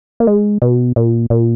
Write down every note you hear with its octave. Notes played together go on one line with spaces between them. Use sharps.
A#3
G#3
B2
A#2
A#2